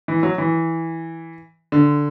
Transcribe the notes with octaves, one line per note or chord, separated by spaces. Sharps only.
E3
F#3
E3
D3